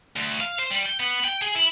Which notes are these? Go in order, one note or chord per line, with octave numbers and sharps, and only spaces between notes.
D2
F5
C5
G3
G5
B3
G5
G#4
E4